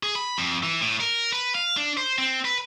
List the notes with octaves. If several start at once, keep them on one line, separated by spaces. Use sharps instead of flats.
G#4
B5
F2
E3
A2
A#4
B4
F5
D4
C5
C4
B4